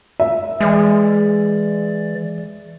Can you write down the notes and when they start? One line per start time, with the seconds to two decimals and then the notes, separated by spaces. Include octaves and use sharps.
0.20 E5
0.61 E3 G#3 D5